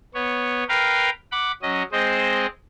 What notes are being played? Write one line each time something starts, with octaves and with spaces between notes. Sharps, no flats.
B3 C#5
A#4 B4 F5 G5
F#5 B5 D6
F#3 C#4 D#5
G#3 C4 C5 D#5